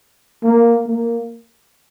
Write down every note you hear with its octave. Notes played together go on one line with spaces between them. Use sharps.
A#3
A#3